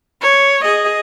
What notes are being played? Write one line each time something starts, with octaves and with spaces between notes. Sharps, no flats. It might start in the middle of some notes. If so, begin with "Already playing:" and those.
C#5
G#4 D#5